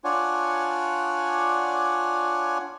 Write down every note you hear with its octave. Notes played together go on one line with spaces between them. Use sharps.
D4 F4 C#5 D5 F#5 G#5